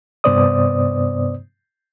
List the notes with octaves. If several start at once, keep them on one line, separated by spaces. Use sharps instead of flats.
G2 C3 B3 C5 D5 D#6